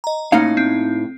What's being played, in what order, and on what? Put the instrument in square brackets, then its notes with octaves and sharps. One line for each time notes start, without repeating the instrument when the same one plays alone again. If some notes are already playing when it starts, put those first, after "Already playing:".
[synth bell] D#5 A#5
[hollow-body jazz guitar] A2 D#4 F5 [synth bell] A#3 C#4
[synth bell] C4